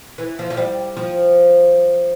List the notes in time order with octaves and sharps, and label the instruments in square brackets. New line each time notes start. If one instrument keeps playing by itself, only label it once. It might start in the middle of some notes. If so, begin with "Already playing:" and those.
[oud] E3
F3
F3
G3
F3